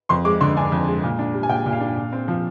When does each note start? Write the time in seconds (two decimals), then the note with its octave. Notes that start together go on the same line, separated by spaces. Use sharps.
0.09 F2 C6
0.25 G#3 D6
0.41 D3 C6
0.57 D4 G#5
0.72 F2
0.88 G#3
1.04 A#2
1.19 D4
1.34 G3
1.43 G#5
1.49 A#2 G5
1.66 A#2
1.72 F5
1.80 D4
1.97 A#2
2.13 C4
2.28 F3